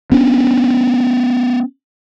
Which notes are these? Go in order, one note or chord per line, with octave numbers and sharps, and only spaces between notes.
B3 C#4 D4